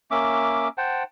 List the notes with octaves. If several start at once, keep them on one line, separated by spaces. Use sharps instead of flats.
A#3 C#4 E5 D6
C5 F#5 G5 A5